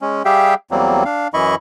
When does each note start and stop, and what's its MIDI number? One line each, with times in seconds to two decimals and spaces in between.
0.02 0.23 56
0.02 0.23 61
0.25 0.54 55
0.25 0.54 67
0.25 0.54 68
0.25 0.54 76
0.25 0.54 77
0.25 0.54 79
0.71 1.04 40
0.71 1.04 54
0.71 1.04 55
0.71 1.04 58
0.71 1.04 60
1.05 1.28 62
1.05 1.28 77
1.34 1.55 42
1.34 1.55 52
1.34 1.55 64
1.34 1.55 75
1.34 1.55 83
1.34 1.55 85